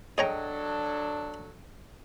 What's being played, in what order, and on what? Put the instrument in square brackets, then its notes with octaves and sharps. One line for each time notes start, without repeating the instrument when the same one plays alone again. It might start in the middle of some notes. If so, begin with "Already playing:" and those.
[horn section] F#3 A4 [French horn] D4 [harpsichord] G#4 C#5 A#5 [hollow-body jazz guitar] D#5 G5